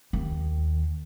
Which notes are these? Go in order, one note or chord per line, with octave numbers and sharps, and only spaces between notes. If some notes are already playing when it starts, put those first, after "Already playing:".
D#2